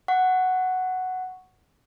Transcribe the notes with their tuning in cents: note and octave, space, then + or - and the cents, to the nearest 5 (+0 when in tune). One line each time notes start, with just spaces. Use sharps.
F#5 +0 C#6 +0